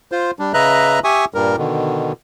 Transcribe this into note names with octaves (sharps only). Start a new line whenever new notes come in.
F4 C5
G3 D4
C#3 B4 D#5 E5 A#5 F#6
G4 E5 G#5 C#6 D#6
G2 A#2 G3 A#4
B2 D3 D#3